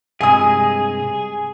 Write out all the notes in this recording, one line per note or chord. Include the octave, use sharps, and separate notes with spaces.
G2 C3 G#3 G#4 G#5 D#6